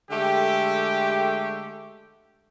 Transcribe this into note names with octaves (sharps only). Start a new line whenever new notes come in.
D3 G#3 A3 G4